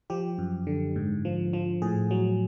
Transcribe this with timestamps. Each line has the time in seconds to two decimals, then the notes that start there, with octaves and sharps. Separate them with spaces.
0.10 F3 G4
0.38 F#2
0.67 D3
0.96 G#2
1.25 F3
1.53 F3
1.82 A2 G#4
2.11 F#3